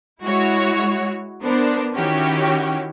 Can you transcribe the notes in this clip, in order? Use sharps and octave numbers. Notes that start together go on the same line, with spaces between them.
G#3 E4 F#4 C#5
B3 D4 A#4 C5
D#3 C#4 E4 F#4 G4